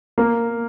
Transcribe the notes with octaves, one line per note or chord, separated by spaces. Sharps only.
A#3